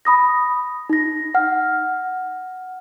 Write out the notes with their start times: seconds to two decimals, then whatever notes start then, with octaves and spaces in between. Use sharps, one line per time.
0.05 B5 D#6 A#6
0.90 D#4 A#6
1.35 F#5 F6